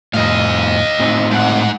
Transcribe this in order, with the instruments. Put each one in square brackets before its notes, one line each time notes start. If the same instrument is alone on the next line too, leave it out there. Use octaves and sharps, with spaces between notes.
[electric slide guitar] F2 A2 [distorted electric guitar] D#5 F5
[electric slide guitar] A2 C4 D#4
[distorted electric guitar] G#2 F#5